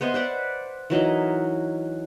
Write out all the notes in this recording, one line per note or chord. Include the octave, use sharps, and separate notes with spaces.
B3 C5 D#5 E5
B4 C5 D5 F#5
E3 F#3 D#4 A#4